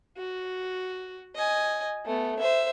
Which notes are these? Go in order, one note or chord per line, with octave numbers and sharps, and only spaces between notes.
F#4
D#5 G#5
A3 B3
C5 E5